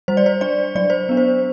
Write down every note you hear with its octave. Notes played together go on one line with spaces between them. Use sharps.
G3 C5
D5
C5
D4 D5
F#3 D5
C5
B3 D4
C5